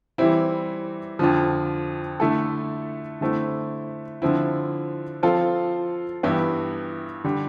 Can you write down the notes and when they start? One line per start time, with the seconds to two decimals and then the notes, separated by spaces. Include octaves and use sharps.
0.18 E3 G3 C4 E4
1.19 F2 D3 F3
2.20 D3 A3 E4 A4
3.21 D3 A3 C4 E4
4.22 D3 F3 C4 E4
5.23 F3 C4 F4 A4
6.23 G2 E3 B3 E4 G4
7.24 D3 G3